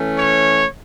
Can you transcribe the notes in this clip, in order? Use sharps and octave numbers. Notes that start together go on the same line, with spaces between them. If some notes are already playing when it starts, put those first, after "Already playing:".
Already playing: E3 A3 C#4
C#5